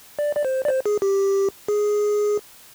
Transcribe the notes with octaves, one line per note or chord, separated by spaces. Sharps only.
D5
D5
C5
D5
C5
G#4
G4
G#4